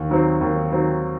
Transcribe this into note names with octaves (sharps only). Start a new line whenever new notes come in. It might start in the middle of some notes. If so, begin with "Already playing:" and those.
Already playing: D#2
D#3 F#3 C4
D#2
D#3 F#3 C4